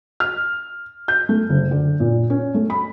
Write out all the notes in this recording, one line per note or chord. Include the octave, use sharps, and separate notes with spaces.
F6
G6
A3
F#1
D3
A#2
C#4
A3
B5